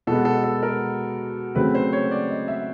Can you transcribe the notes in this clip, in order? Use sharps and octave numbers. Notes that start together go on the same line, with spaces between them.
B2 G#3 B3 A4
A4
A4
A#4
C#3 F#3 A3 C4 B4
C5
C#5
D5
D#5
E5